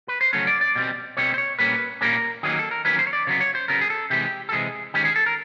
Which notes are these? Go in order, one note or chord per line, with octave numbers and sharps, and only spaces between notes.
B4
C5
C#3 F#3 A3 C#4 C#5
D5
D5
B2 G3 C4
B2 G3 C4 C#5
C5
C#5
A#2 G3 A#3 C#4 B4
A#2 G3 A#3 C#4 A#4
D#3 F#3 A#3 C#4 G#4
A4
A#4
D#3 F#3 A#3 C#4 B4
C5
C#5
D5
C#3 F#3 B3 C#5
C#5
C5
C#3 F#3 B3 A#4
G#4
A4
C3 E3 G#3 G4
A4
C3 E3 G#3 G#4
D#3 G#3 C#4 G4
G#4
A4
A#4